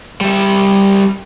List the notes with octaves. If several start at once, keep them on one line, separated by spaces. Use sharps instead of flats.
G3 E5